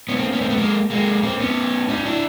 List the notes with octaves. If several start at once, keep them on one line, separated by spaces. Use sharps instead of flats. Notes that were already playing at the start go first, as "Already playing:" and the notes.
B3 C#4
A#3 C4
B3 C#4
A#3 C4
A3 B3
G#3 A#3
G#3 A#3
A#3 C4
B3 C#4
C#4 D#4
D4 E4